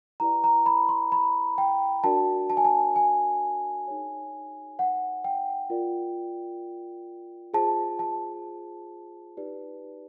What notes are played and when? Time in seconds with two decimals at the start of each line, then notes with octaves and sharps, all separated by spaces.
0.20 E4 G4 B4 D5 A#5
0.44 A#5
0.66 B5
0.89 C6
1.12 B5
1.58 G5
2.04 D4 F#4 A#4 D5 A5
2.50 A5
2.57 G#5
2.65 A5
2.96 G#5
3.87 D#4 G#4 C#5
4.79 F#5
5.24 G5
5.70 F4 A#4 D5
7.54 F4 G#4 C5 A5
7.99 A5
9.37 D#4 G4 B4 D5